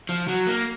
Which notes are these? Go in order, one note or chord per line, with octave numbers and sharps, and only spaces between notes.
F3
F#3
A#3